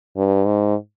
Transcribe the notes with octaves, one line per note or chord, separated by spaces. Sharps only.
G2
G#2